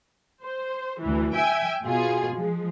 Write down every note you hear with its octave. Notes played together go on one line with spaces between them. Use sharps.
C5
D2 E3
E5 G5 G#5
B2 F4 G#4
F3 G#3